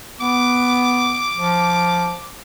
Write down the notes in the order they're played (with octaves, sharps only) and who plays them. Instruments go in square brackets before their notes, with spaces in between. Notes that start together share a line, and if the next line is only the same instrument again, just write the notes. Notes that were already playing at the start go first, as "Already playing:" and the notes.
[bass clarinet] B3 [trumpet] D6
[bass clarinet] F3